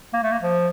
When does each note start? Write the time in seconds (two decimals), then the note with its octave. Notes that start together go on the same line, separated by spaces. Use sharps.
0.13 A#3
0.23 A3
0.32 A#3
0.42 F3